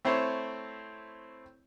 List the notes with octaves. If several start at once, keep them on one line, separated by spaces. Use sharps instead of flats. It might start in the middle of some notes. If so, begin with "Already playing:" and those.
A3 C4 E4 C5 C#5